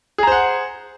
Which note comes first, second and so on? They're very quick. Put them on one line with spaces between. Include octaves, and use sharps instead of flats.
G#4 A#5 C5 F#5